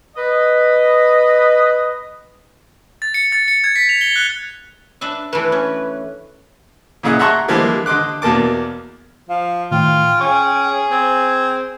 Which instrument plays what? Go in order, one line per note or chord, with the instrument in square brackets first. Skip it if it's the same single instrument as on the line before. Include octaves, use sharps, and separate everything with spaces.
[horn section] B4 D#5
[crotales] A6
C#7
A6
C#7
G#6
B6
F7
G7
F#6
[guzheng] D4 B4 E5
[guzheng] E3 A3 [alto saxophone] B4
[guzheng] C#4
[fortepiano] A#2 C#3 E4 G#4 D#5 F#5
E5 F#5 A5 A#5 C6 C#6
D3 E3 F3 G3 G#3 A#3
D3 D#5 C6 D6 F#6
E2 B2 A#3 A5 D6
[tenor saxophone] F3 [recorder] F5
[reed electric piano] A2 D#3 [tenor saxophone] F4 [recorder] G5
[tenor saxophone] C#4 [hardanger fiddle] G#4 [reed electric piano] C#6
[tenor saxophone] C4 [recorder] G#6